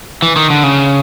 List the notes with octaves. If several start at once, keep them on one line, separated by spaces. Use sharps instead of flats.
E3
D#3
D3
C#3